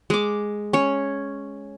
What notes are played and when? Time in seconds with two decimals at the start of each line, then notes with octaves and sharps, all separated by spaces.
0.10 G#3 D6
0.73 C#4 C#5